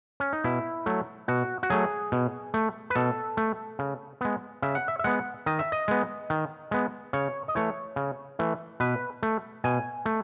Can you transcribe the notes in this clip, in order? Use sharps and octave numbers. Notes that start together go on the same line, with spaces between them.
C#4
D#4
B2 E4
F#3 A3
B2 F#4
F#4
F#3 A3 G#4
B2
A3
B4
B2 A4
A3
C#3
G#3 B3
C#3 E5
F#5
E5
E5
G#3 B3 F#5
D#3 D#5
E5
D#5
G#3 B3
D#3
G#3 B3
C#3 C#5
D#5
E3 A3 C#5
C#3
E3 A3
B2 B4
A3
B2 G#5
A3